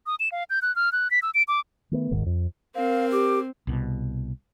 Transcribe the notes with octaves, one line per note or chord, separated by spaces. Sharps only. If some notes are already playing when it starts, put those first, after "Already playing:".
D#6
E7
F5
G6
F#6
F6
F#6
B6
E6
D7
D6
D#3 A3 B3
D#1 G#1 G#2 D#3
F2
C4 A#4 F5
G4 D6
C2 B2